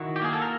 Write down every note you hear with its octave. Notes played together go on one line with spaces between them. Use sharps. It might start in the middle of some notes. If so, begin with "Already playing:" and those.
Already playing: D#3 E4 F#4
G4
A#3 G#4
A4
A#4